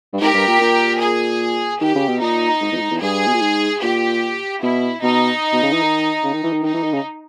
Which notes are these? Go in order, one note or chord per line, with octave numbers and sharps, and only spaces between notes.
G2
G#2 G4 A#4
G2
A#2
A#2
G#4
D#3 G4
C#3
B2
A#2 D#4
G#2
E2
A#2
G#2
E2
G2 G#4
B2
A#2
G#2
A#2 G4
B2 E4
B2 D#4
B2
C#3
E3
D#3
C#3
D#3
E3
D#3
D#3 D#4
E3
D#3
C#3